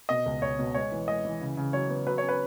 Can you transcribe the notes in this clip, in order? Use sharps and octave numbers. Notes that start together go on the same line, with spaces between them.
B2 D#5
C#2
C#2 C#5
B2
G#3 C#5
E3
G#3 D#5
E3
C#3
C#3
F#3 C#5
B3
F#3 B4
C#5
C#4
B4